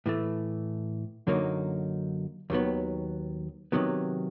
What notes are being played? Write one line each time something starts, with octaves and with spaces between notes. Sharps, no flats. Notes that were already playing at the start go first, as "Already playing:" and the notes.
A2 E3 A3
F#2 D3 F#3 A#3 D#4
D#2 D#3 F#3 B3
C3 D#3 F#3 B3